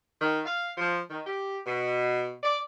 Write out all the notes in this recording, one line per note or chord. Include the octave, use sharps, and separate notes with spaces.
D#3
F5
F3
D#3
G4
B2
D5